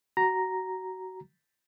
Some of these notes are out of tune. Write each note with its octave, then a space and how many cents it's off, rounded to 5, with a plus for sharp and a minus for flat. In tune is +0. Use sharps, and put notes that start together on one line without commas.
F#4 +20 A#5 +0